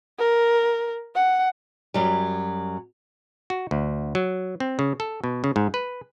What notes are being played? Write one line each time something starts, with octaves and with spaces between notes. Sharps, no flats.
A#4
F#5
F#2 F#3 G3
F#4
D2
F#3
C4
C#3
A4
B2
C#3
G#2
B4